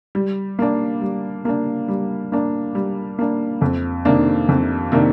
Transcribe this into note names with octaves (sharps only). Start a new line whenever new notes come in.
G3
A#3 D4
G3
A#3 D4
G3
A#3 D4
G3
A#3 D4
F2
C3 D#3 A#3 D4
F2
C3 D#3 A#3 D4